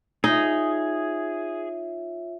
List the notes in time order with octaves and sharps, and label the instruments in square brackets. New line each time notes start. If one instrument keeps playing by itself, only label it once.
[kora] D#4 [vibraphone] F4 C#5 E5 [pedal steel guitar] G#4